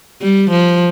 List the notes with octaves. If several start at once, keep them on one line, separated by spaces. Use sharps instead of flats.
G3
F3